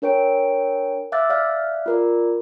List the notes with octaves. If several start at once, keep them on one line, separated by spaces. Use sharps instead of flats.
D4 A#4 C#5 G5 D7
E5 F5 D6 E6 F#6 A6
D5 E5 F5 F6 F#6
F4 A#4 D5